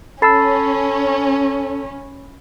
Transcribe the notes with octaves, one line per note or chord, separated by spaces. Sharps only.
C#4 A4 A5 B5 E6 A6 C7